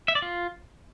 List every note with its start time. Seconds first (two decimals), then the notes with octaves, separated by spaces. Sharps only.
0.08 E5
0.15 D5
0.22 F4